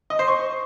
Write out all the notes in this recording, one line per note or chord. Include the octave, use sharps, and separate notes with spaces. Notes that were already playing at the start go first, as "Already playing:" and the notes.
D#5
C5
C#6